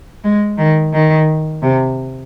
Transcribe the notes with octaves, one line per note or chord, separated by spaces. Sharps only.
G#3
D#3
D#3
C3